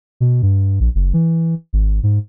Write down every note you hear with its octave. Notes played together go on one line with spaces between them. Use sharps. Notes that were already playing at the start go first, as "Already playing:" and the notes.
B2
G2
A#1
F#1
E3
G#1
G#2